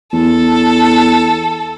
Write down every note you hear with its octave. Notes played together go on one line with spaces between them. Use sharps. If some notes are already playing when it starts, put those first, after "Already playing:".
E2 A4